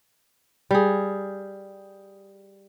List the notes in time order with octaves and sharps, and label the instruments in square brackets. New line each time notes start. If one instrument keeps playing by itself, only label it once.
[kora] G3 G#4